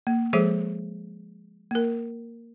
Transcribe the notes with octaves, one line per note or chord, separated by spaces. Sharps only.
A#3
F3 G#3 G#4 A4 C5 E5
A#3 A#4